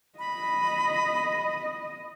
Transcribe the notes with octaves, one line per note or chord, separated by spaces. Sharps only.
D#5 B5